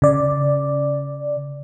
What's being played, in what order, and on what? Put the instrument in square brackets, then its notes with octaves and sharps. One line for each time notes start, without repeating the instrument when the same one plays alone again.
[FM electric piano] C#3 D5